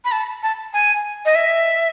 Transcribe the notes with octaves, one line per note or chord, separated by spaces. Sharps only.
B5
A5
A5
G#5
D#5
E5